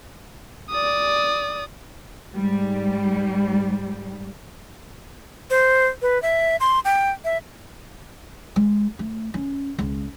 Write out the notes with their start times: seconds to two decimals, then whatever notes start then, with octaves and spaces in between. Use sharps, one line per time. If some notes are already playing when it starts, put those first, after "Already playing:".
0.70 D5 D#6
2.35 G#2 G3
5.50 C5
6.02 B4
6.22 E5
6.60 C6
6.85 G5
7.24 E5
8.56 G#3
8.99 A3
9.34 C#4
9.79 C#2